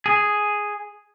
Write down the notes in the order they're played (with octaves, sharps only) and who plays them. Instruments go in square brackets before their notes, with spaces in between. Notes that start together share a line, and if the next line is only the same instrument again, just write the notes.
[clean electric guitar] G#4